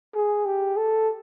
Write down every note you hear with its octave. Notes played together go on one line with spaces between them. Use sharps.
G#4
G4
A4